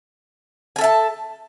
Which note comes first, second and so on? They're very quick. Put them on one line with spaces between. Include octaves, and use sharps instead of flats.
G#5 A4 E5 A5